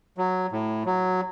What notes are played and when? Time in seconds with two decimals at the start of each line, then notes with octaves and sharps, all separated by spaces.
0.18 F#3
0.52 A2
0.86 F#3